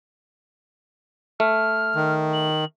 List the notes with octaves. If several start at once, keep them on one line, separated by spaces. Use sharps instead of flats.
A3 F6
D#3
F#7